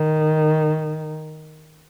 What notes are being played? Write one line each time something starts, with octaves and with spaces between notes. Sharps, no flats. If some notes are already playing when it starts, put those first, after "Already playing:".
Already playing: D#3